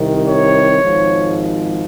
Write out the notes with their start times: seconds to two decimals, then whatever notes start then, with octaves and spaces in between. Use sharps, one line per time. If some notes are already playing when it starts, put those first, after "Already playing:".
Already playing: C2 C3 D#3
0.25 C#5
0.82 G#1 G#2 F3